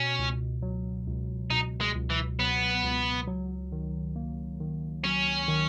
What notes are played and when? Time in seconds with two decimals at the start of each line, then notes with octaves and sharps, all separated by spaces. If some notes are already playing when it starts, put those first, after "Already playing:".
Already playing: B2 C#4
0.19 C#2
0.62 F#3
1.07 C#2
1.50 B2 D#4
1.81 G#3
1.95 C#2
2.10 E3
2.39 F#3 B3
2.84 C#2
3.27 F#3
3.72 D#3
4.16 A#3
4.60 D#3
5.04 F#3 C#4
5.48 D#3